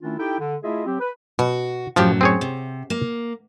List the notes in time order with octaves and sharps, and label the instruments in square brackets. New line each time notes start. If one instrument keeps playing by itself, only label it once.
[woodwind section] D#3 A3 C#4 D4 E4 F4
D#4 E4 G4 A4 G5
D3
A3 E4 F4 G#4 D#5 E5
F#3 C4 G4
B4
[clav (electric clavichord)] B2 [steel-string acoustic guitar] F#4
[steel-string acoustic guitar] F#2 A2 F#3 [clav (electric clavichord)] F3 G4
[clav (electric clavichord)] C4 G#4 C#5
[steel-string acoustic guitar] C3
A#3